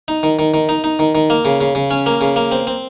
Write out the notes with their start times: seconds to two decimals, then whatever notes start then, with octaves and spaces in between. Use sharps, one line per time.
0.08 D#4
0.23 D#3
0.39 D#3
0.54 D#3
0.69 D#4
0.84 D#4
0.99 D#3
1.15 D#3
1.30 A#3
1.45 C#3
1.61 C#3
1.75 C#3
1.91 C#4
2.06 A#3
2.21 C#3
2.36 A#3
2.52 C4
2.67 C4